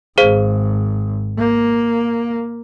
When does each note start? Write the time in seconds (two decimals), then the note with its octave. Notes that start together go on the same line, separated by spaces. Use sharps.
0.18 G#1 G#4 C5 F5
1.38 A#3